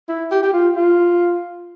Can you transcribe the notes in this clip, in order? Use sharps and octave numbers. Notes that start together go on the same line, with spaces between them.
E4
G4
G4
F4
F4